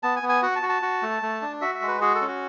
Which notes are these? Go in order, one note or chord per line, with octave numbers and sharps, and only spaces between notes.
B3 A5
G#5
B3
G#5
F#4 F#5
A5
F#4
A5
F#4
A3
A3
D4
F#4 E5
E5
G#3
B4
F#4 G#4
A4
C#4
F#4